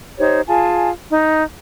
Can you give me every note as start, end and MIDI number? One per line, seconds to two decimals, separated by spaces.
0.19 0.41 63
0.19 0.41 67
0.19 0.41 72
0.19 0.41 73
0.47 0.89 65
0.47 0.89 68
0.47 0.89 80
0.47 0.89 81
1.10 1.42 63